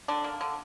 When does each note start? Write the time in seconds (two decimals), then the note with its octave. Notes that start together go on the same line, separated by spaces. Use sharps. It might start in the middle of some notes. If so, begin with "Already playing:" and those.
0.08 D3 D4
0.24 A#3
0.41 D3